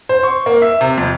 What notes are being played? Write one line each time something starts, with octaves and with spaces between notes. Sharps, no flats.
C5
C#6
A#3
E5
C3
F2